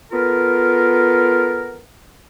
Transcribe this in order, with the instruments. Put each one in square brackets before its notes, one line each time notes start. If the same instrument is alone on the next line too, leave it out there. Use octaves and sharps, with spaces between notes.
[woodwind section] B3 F4 A4 A#4